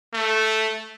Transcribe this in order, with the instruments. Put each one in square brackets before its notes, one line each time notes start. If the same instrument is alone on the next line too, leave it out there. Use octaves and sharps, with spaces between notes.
[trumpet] A3